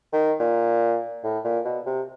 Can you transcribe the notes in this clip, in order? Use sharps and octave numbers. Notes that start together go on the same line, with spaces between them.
D#3
A#2
A2
A#2
B2
C3